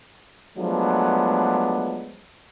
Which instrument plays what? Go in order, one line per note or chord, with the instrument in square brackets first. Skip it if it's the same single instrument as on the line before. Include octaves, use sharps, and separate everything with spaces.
[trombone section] F3 F#3 G#3 A3 B3 D4